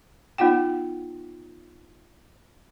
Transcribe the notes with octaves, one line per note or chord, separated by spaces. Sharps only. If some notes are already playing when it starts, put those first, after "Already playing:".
B3 D#4 F4 F#5 G5